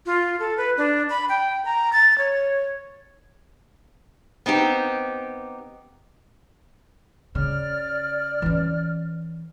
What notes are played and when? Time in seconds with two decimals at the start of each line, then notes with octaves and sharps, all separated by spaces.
0.06 F4
0.40 A4
0.57 B4
0.77 D4
1.10 B5
1.29 G5
1.65 A#5
1.93 A6
2.18 C#5
4.46 B3 C4 D#4 G4
7.35 C#3 D5 F6
8.42 E3 C#4